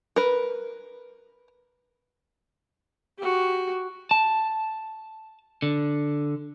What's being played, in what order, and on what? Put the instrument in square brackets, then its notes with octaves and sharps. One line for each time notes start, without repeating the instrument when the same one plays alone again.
[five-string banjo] A#4 B4
[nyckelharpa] F#4 G4
[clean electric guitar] A5
D3